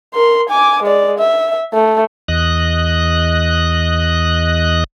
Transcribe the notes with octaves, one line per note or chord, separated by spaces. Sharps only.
A#4 C6
G#5 D6
G#3 D5
E5
A3
E2 D#5 F#6